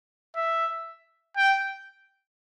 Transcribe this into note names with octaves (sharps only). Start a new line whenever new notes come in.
E5
G5